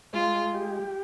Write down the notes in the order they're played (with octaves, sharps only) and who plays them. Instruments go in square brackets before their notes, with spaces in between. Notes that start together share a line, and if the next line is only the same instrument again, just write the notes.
[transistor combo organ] G#3 [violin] F4
[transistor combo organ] G4